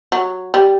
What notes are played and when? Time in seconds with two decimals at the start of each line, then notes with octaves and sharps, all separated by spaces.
0.12 F#3
0.54 G3